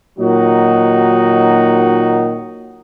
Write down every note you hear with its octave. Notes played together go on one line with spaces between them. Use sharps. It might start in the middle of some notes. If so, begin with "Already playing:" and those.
A#2 D#3 F#3 D#4 F#4